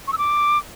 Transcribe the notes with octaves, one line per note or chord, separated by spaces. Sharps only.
C#6
E6
D6